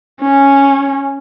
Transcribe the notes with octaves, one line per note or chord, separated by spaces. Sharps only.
C#4